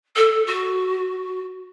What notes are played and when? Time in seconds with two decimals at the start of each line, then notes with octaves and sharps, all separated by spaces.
0.16 A4
0.46 F#4